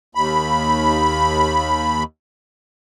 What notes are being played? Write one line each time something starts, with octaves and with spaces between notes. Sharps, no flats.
D#2 B5